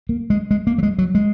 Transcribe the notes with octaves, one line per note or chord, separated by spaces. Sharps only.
A#3
G#3
G#3
A#3
F#3
G#3
F#3
G#3